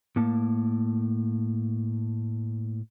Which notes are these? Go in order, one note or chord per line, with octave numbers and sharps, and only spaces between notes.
A2 A#3 A5